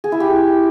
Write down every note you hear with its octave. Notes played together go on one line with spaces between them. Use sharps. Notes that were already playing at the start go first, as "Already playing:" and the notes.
G#4
E4
G4